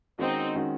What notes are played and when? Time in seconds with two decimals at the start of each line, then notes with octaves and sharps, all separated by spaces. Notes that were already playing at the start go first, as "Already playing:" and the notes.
0.18 D#3 G#3 C4 C#4 D#4 F#4
0.54 D#3 G#3 C#4 F#4